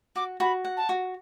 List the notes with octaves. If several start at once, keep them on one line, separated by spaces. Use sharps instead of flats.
F#4 D6
F#4 B5
F#5
A5
F#4